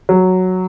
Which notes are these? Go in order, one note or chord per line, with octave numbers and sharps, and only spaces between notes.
F#3